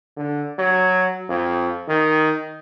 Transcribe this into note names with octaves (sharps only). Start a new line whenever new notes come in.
D3
F#3
F2
D#3